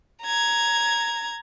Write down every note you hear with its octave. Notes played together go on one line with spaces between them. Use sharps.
A#5 G#6